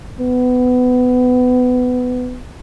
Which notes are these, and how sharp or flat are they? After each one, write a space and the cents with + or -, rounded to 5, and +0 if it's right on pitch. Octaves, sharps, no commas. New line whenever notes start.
B3 +20